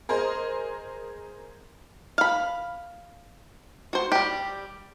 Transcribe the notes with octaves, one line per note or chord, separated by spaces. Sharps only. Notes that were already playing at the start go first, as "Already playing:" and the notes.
G#4 A#4 C5 D#5
F5 B5
F#4 C5
G3 G4